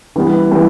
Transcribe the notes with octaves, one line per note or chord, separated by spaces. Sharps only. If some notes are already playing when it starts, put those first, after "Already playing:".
E3 G3 B3
E3 G3 B3